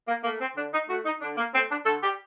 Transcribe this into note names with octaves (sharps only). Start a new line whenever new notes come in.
A#3
A3 A#3
C4
D3 D4
D#4
A3 F#4
D#4
D3 D4
A#3
A3 C4
D4
D3 A4
G4